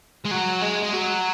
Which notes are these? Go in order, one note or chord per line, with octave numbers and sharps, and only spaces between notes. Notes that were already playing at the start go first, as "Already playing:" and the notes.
G#3
F#3
G#3
G#3
F#3